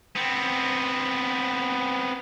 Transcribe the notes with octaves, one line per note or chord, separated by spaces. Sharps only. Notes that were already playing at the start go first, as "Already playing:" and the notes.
B3 C4